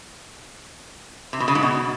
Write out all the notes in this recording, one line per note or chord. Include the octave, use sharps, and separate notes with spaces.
C3
B2
C#3
G#2
B2